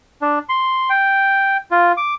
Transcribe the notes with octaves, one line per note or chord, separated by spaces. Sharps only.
D4
C6
G5
F4
D6